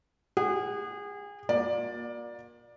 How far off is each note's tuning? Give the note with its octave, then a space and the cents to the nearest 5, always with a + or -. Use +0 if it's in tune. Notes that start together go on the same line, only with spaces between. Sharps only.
G#4 -30 F#5 +25
A#3 +30 F4 +45 D5 +10